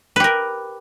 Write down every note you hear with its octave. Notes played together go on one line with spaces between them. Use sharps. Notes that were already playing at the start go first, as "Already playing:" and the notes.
G4 A#4 B4